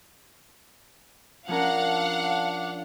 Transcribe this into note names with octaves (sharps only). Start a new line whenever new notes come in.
F3 C#4 D4 A#4 F5 F#5